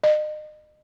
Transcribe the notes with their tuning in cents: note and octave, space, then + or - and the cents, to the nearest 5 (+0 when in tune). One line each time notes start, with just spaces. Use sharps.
D#5 -35